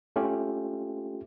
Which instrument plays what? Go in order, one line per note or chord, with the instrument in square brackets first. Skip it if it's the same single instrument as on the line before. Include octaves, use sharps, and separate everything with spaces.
[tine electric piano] A3 C#4 F4 G4